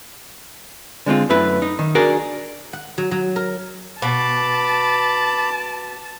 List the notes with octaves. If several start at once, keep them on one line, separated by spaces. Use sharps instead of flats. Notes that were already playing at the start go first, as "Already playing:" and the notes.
D3 G#3 C4 F4
F#2 A3 E4 B4
D#4
D#3
D4 F#4 G#4 A#4 D5
F#5
F#3
F#3
A#4
B2 A5 B5 D6